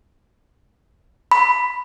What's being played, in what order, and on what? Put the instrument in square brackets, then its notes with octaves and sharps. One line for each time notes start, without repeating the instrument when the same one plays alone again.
[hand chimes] B5